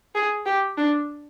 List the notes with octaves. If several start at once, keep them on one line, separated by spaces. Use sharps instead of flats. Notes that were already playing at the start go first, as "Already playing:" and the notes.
G#4
G4
D4